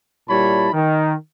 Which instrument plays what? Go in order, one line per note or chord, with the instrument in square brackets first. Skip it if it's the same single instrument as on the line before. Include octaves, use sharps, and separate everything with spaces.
[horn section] A#2 G3 E4 C#5 A5 B5
D#3